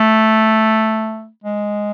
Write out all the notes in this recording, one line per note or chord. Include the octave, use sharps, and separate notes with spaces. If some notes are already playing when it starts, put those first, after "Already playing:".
Already playing: A3
G#3